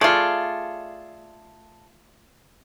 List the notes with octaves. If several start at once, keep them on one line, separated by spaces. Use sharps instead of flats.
A3 F4 G#4 A4 D5